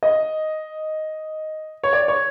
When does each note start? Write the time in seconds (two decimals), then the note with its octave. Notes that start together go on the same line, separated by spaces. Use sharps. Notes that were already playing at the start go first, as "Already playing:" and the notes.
0.03 D#5
1.84 C#5
1.93 D5
2.08 C#5